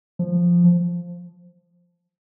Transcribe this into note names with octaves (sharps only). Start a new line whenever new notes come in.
F3